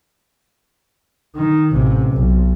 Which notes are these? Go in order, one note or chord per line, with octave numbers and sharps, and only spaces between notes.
D#3
A1 C3
B1